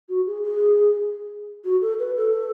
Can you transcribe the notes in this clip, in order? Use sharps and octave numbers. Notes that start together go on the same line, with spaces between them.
F#4
G#4
G#4
F#4
A4
B4
A4